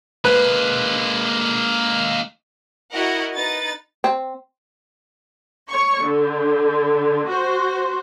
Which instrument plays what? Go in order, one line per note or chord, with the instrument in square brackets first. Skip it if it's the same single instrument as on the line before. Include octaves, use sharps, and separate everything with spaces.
[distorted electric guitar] G#3 A#3 [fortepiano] B4
[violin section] E4 F#4 A#4 D#5 F#5
D#4 B4 A6
[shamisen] C4
[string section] C#5 C#6
D3
F#4 C5